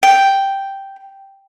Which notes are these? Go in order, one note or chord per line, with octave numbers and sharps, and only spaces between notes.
G5